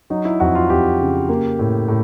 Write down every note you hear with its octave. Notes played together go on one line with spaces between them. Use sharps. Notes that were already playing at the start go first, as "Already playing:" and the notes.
F#3 D#4
E4
F2 F#4
F4
F2 G4
C#3
A#3
A2
A2